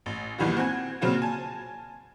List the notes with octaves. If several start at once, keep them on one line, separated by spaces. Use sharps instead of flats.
A1
B1 A#2 D#3 E3 G3 F#4
C4 F#5 G#5 G#6
A#2 C#3 F#3 C4 F4 F#4
G#5 A5